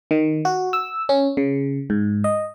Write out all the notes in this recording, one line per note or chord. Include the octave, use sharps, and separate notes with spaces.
D#3
F#4
E6
C#4
C#3
G#2
D#5